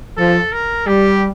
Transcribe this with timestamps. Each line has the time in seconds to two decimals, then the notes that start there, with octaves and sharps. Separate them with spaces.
0.17 F3 A4
0.52 A#4
0.87 G3 G4